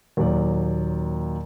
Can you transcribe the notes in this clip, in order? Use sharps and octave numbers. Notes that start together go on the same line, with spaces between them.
D#2 A#2 F#3 D5